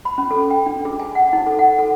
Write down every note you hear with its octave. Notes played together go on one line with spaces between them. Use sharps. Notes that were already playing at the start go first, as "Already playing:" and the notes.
B5
C#4
A4
G5
D4
G#4
G#5
F#5
D#4
A4
F#5
A4